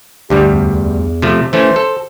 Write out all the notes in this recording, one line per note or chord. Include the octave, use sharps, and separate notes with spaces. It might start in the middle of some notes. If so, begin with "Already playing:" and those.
D2 G2 G3 G4
E2
C3 F3 A3
E3 A3 C#4 C5
A4